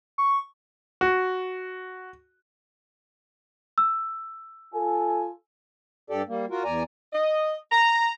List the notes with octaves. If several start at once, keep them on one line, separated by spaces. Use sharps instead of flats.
C#6
F#4
E6
F4 A4 G#5
G2 G4 A4 D5
G3 A#3
F4 F#4 A#4
E2 D5 G#5 A#5
D#5
A#5